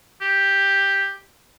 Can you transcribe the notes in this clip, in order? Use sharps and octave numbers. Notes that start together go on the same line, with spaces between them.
G4